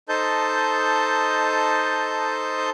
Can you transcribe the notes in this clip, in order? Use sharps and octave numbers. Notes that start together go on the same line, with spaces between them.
D#4 A4 C5 D#5 A5 G6